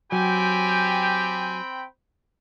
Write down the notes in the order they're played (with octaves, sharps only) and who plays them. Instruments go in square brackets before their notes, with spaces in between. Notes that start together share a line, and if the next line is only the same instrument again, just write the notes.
[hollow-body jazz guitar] F#3 [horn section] C4 G5 B5 [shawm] G4 [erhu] G#5